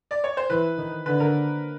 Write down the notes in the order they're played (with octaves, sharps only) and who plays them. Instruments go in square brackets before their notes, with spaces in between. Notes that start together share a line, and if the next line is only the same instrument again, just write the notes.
[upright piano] D5
C#5
C5
[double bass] E3 [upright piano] B4
[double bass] D#3
[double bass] D3 [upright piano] B4
[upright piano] A#4